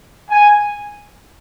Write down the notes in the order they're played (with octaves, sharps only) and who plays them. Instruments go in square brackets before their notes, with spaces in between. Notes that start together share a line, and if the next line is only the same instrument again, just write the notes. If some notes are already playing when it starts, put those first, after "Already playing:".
[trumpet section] G#5